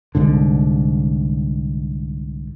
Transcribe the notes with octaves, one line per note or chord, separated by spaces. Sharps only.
C2 G#2 D3